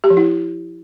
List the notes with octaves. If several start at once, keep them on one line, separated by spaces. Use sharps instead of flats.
G4
F3
E4